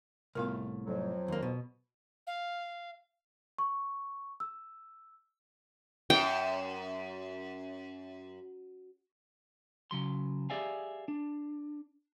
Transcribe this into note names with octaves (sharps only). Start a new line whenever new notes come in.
C2 A2 B3 F4 A#4 F5
F2 F#3
D#2 A#3
B2
F5
C#6
E6
F#2 G5
C#3 F#3 C6
G4 G#4 D5 E5 F5 G#5
D4